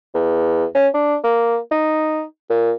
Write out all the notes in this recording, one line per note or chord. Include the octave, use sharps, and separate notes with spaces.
E2
C#4
D4
A#3
D#4
A#2